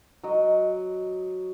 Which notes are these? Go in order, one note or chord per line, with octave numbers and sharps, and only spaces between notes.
F#3 D#5